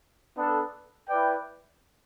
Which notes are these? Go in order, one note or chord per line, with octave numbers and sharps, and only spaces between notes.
B3 D4 A4
E4 B4 D5 G5